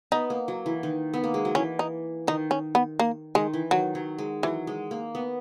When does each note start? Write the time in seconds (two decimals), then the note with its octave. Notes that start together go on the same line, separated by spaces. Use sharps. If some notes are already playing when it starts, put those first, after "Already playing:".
0.12 B3 D#4
0.30 A#3
0.48 F#3
0.66 E3
0.83 D#3
1.14 B3
1.24 A#3
1.34 G#3
1.45 F#3
1.55 E3 C#4
1.79 D#4
2.27 D#3 D#4
2.51 C#4
2.75 B3
3.00 A#3
3.35 D#3 G#3
3.54 E3
3.71 D#3 F#3
3.95 F#3
4.18 G#3
4.43 E3 F#3
4.67 G#3
4.91 A#3
5.15 B3